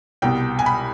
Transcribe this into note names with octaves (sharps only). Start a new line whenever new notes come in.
C2 B2 G5
G#5
B5